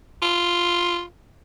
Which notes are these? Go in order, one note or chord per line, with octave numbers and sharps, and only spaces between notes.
F4